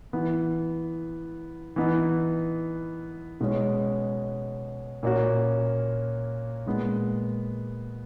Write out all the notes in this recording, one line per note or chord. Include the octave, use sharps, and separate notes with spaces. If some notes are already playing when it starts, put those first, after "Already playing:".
E3 B3 E4
E3 B3 D#4
B2 G#3 C#4
A#2 A#3 C#4 F#4
A#2 G#3 B3